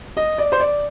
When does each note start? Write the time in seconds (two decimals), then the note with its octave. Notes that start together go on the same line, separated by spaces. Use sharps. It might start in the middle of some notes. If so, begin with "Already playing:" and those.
0.17 D#5
0.38 D5
0.52 C5
0.60 D5